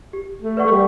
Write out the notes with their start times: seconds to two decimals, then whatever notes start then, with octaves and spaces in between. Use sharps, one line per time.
0.13 G4
0.42 A3
0.57 B4 D5 F#5 C#6
0.66 A3
0.71 G3